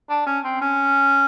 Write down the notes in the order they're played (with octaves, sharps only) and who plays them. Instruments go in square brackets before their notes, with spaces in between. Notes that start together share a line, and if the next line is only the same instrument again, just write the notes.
[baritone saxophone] D4
C#4
C4
C#4